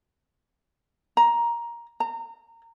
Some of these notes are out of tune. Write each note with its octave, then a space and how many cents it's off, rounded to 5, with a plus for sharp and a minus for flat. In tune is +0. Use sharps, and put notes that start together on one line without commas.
A#5 +10
A#5 -25